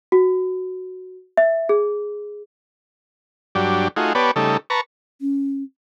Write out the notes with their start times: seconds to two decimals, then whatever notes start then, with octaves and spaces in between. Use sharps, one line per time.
0.12 F#4
1.37 E5
1.69 G#4
3.55 G2 F#3 D4 G4
3.96 A3 D#4 F4 F#4 G#4
4.15 B3 G4 B4 C#5 D5 A5
4.36 C#3 G3 A3 D#4 A4
4.70 B4 A5 A#5 C#6
5.21 C#4